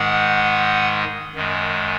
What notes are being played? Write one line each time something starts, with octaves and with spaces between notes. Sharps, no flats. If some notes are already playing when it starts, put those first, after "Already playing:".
Already playing: G#2 D#3 G#3 F#5
F#2 D#3 G#3